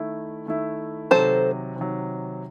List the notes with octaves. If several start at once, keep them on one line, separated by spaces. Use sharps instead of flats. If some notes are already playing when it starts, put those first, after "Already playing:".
Already playing: D#3 A3 E4
D#3 A3 E4
C3 D#3 F#3 A4 C5
C3 D#3 F#3